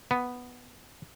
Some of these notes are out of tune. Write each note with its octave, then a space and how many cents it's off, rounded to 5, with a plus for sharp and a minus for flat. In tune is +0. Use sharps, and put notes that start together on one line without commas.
B3 +0